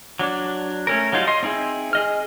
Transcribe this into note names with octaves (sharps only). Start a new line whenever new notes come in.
F#3 D4
A3 C#4 A#4
F#3 G3 D#4 F4
D#5 C6
C4 D#4 E4 G#4
G#4 D#5 F6